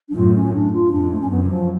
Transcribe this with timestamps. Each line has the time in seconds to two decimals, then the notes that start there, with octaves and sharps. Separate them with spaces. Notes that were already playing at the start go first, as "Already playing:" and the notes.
0.08 D4
0.15 F#2 A2 F4
0.34 C#4
0.53 D4
0.73 F4
0.92 F2 D4
1.11 A3
1.21 C#4
1.30 F#2 B3
1.43 D3
1.49 F3